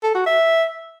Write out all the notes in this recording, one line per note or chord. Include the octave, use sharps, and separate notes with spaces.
A4
F#4
E5